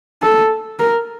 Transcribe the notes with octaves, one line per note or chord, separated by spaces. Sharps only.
A4
A#4